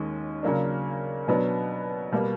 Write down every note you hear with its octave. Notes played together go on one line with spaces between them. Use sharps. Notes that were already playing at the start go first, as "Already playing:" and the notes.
Already playing: D#2 D#3 G#3 C#4
C#3 F#3 A#3 D4
B2 F#3 B3 D4
B2 G3 A#3